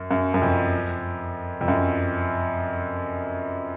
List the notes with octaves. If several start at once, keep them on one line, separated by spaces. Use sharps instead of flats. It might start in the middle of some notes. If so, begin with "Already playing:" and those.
Already playing: F#2
F#2
F#2
F2
F2
F#2